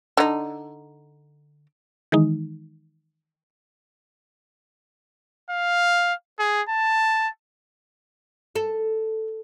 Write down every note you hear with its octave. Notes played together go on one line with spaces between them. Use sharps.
D3 D#4
D#3 E3 G#3 D#4
F5
G#4
A5
A4